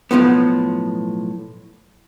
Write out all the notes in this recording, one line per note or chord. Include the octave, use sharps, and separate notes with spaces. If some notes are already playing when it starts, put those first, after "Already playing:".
B1 A2 C3 F3 B3